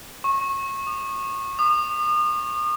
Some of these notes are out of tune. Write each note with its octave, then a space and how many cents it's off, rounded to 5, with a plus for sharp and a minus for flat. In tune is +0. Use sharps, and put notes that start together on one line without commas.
C#6 -25
D6 +45
D#6 -40